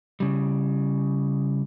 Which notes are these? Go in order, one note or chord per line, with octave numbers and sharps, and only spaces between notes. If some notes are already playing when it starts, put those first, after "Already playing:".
C#3 G3